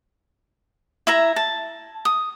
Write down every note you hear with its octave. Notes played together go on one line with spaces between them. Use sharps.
E4 E5 A#5
A5
D#6